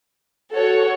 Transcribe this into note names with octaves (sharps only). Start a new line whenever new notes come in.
F#4 A4 C#5